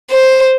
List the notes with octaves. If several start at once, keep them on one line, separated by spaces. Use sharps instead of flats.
C5